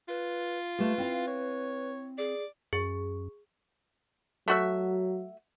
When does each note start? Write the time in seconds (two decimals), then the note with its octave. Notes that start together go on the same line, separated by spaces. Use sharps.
0.08 F4 B4
0.79 A3 G4 B4
0.98 C4 E4 F5
1.27 C#5
2.18 G#4 D5
2.73 F#2 G#4
4.48 F#3 A3 F#4 E5